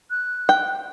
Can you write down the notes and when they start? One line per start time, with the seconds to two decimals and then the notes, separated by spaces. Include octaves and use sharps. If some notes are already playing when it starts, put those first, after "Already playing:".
0.10 F#6
0.49 G5